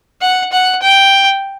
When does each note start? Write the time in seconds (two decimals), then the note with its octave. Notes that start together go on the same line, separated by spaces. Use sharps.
0.21 F#5
0.52 F#5
0.82 G5